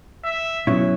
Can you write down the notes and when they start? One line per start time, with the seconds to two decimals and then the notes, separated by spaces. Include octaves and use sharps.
0.24 E5
0.67 B2 F#3 C#4 E4